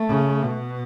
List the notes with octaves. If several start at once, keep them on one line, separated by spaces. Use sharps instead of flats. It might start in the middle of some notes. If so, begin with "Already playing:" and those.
Already playing: A3
C#3
B2